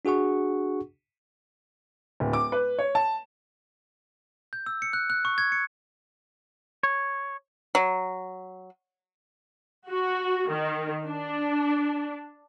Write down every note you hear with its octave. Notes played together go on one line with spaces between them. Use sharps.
D4 F#4 G#4 F#5 C#6
D1
D6
B4
C#5
A5
G6
E6
C#7
F#6
F#6
C#6
G#6
C#7
C#5
F#3
F#4
D#3
D4